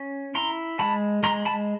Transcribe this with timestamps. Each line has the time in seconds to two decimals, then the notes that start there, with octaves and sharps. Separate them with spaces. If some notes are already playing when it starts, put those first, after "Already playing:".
Already playing: C#4
0.35 E4 A#5 C6
0.79 G#3 A5 B5
1.23 G#3 A#5 C6
1.45 A5 B5